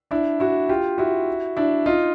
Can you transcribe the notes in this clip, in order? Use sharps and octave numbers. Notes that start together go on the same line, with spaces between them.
D4 E4
E4 F#4
F4 G4
E4 F#4
D4 E4
D#4 F4